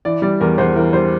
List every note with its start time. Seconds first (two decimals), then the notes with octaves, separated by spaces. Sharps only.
0.05 E3 D5
0.22 G3 D5
0.40 E2 A#4
0.58 E2 C5
0.76 E3 A#4
0.93 G3 C5